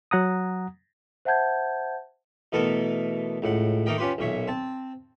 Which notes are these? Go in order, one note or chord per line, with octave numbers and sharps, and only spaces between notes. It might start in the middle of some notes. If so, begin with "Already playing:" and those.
F#3 F#5 A#5 D#6
C5 E5 F#5 A5 G6 G#6
B2 E3 A3 B3 A4 A#4
C#2 A2 F#5
A3 A#3 D#4 A#4 D#5 G5
C#4 F4 G4 B4 C5
B1 A#2 C#5 E5
C4 A5